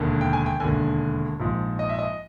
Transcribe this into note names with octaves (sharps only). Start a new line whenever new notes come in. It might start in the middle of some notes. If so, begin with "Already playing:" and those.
Already playing: E1 D#2 D3
G5
G#5
G5
E1 D#2 D3 G#5
A#1 G#2 F3
D#5
E5
D#5